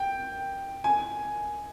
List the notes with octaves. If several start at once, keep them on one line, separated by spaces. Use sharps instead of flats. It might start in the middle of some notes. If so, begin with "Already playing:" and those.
Already playing: G5
G#5